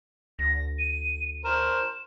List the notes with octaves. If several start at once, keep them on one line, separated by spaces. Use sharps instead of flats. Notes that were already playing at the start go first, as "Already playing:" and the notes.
D2 A#6
D#7
A#4 C5 E7